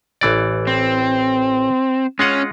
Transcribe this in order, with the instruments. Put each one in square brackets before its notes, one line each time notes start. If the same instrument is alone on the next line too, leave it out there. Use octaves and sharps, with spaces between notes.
[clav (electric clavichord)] A1 E3 D5
[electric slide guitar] C4
[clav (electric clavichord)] G#3 F4 F#5 [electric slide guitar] C#4